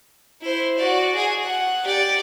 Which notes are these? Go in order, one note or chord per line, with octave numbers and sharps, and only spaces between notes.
E4 C5
F#4 D5
G#4 G#5
F#5
G4 D5